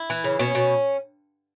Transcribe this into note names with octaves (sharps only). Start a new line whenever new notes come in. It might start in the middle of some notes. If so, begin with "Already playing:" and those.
Already playing: E4
E3
C#3
B2 C#4
B2